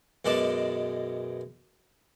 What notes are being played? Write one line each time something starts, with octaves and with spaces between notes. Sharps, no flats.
F#2 B2 G#3 D5 A5